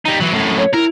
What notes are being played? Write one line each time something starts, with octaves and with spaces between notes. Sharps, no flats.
G3 D#4
E3 F#3
F#2 A2
C#5
E4 A#4